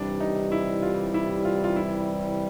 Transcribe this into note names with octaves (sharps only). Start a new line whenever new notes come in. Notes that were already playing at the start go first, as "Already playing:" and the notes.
Already playing: C3 E3 G3 D4
D#4
E4
F4
E4
F4
F4
E4